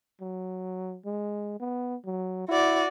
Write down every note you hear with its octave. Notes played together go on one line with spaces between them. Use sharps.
F#3
G#3
B3
F#3
E4 F#4 D5